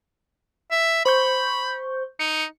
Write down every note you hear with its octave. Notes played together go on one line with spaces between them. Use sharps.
E5
C5 B5 C#6 G6
D#4 C#7